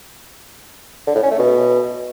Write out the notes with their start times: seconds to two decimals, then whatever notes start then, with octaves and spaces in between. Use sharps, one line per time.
1.07 D3
1.15 A2
1.23 C#4
1.31 A3
1.39 B2